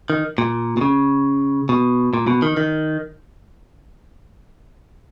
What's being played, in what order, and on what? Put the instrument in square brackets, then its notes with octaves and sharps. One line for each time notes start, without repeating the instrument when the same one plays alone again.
[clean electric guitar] D#3
A#2
B2
C#3
B2
A#2
B2
D#3
D#3